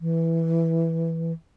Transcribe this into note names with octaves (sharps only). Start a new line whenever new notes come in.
E3